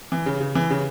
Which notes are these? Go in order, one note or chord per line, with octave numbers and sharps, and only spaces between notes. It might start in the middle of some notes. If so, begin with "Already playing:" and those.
E3
C#3
C#3
E3
C#3